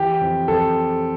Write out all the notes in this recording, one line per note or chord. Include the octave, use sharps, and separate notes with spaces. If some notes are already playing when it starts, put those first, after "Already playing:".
Already playing: E3 G4
F2
F2 A4